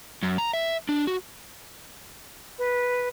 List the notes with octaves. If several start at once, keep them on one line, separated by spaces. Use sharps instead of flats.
F#2
A#5
E5
D4
F#4
B4